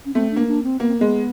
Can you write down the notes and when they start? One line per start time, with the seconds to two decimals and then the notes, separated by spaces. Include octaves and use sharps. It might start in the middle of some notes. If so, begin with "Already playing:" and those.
0.05 C#4
0.14 A3 C4
0.31 D4
0.36 A#3
0.48 D4
0.63 C4
0.80 A#3 B3
0.88 C4
0.97 G#3 B3